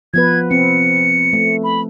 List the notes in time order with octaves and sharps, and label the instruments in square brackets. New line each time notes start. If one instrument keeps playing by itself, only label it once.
[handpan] F3 B3 B4 [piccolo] G#6
[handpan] C4 [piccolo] C#7
[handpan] A3
[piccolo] B5